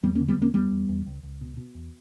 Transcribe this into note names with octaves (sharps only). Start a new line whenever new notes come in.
E2 G3 B3
A#3 C#4
D3
G3 B3
E2 A#3 C#4
E2 G3 B3
E2
E2
C#2
C#2
B2
B2
E2